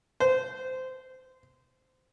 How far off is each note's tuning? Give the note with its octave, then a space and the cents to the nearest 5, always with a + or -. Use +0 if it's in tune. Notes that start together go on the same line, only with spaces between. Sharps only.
C5 -20